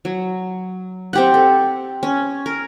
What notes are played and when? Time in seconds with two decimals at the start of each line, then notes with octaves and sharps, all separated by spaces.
0.05 F#3
1.13 C4 G4 F#5
1.34 A4
2.03 C#4
2.46 A#4